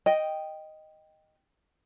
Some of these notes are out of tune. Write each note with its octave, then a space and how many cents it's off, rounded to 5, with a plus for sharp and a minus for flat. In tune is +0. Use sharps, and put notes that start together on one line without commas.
D#5 +0 G5 +0